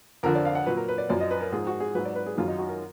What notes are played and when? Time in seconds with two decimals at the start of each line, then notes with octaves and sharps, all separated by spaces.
0.23 F2 D3 F3 A#4
0.35 D5
0.45 F5
0.55 F#5
0.66 A#2 F#3 B4
0.77 A#4
0.88 B4
0.98 D5
1.09 F#2 F3 D5
1.20 D#5
1.31 B4
1.41 A#4
1.52 G#2 F3 G#4
1.67 F#4
1.80 G#4
1.95 F#3 B4
1.98 G#2
2.05 D5
2.16 B4
2.26 G#4
2.37 F#2 D#3 F#3 F4
2.48 D#4
2.59 F#4
2.69 A#4